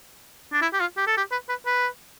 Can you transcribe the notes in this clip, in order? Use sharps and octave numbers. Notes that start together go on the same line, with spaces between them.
D4
E4
G4
F4
G4
A4
G4
B4
B4
B4